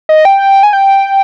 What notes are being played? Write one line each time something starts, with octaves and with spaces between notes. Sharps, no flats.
D#5
G5
G#5
G5